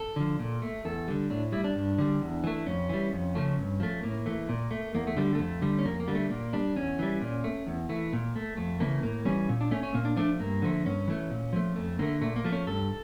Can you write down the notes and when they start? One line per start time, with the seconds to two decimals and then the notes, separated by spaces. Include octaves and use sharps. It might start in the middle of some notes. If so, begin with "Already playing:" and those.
Already playing: A4
0.16 D3 F3
0.39 A#2
0.62 A3
0.85 E2 A4
1.08 D3 G3
1.30 A2 D4
1.52 G3 E4
1.64 D4
1.75 G2
1.98 D3 G3
2.21 E2
2.44 E3 A3
2.66 F2 C#4
2.89 E3 G3
3.13 F2
3.35 C#3 F3 A3
3.58 G2
3.80 F3 A3
4.03 A2 A#3
4.26 E3 A3
4.49 A#2
4.71 A3
4.94 E2 A#3
5.07 A3
5.17 D3 G3
5.35 F2 A3
5.62 D3 G3
5.79 C#4
5.85 F2 A#3
6.00 A#3
6.08 D3 G3
6.15 A3
6.30 A#2 A#3
6.53 G3 D4
6.76 E2 C#4
6.99 E3 G3
7.21 A#2
7.44 A3
7.67 E2
7.89 E3 A3
8.13 A#2
8.36 A3
8.57 F2 A3
8.80 C#3 E3 A3 A#3
9.02 A2 A#3
9.25 E3 G3 C#4
9.49 A#2
9.61 D4
9.71 A3 C#4
9.83 C#4
9.94 A#2 A#3
10.05 D4
10.16 F3 A3 D4
10.39 G2 A#3
10.62 D3 F3 A3
10.85 G2 C#4
11.08 E3 A3
11.30 A#2
11.53 F3 A3
11.76 F2 A3
11.99 D3 A3 A#3
12.21 A#2 A3
12.36 A#3
12.44 F3 A3
12.52 C#4
12.67 G2 A4